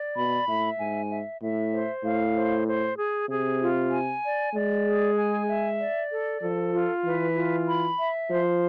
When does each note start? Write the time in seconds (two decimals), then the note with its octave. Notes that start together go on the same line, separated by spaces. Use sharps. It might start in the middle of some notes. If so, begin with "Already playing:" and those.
Already playing: D5
0.16 B2 B5
0.47 A2 E5
0.79 G#2 G#5
1.10 E5
1.41 A2 E5
1.73 C5
2.04 A2 F5
2.35 C5
2.67 C5
2.97 G#4
3.29 C3 G#4
3.61 F4
3.91 G#5
4.24 D5
4.54 G#3 D5
4.86 G#4
5.16 G#5
5.49 E5
5.79 D5
6.11 A4
6.42 F3 A4
6.73 F4
7.04 E3 B4
7.35 F4
7.67 B5
7.98 E5
8.30 F3 C5